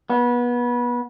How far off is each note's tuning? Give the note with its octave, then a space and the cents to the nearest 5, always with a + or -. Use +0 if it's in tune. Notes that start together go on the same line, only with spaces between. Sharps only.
B3 -25